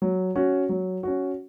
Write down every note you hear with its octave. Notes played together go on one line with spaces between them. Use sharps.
F#3
C#4 F#4
F#3
C#4 F#4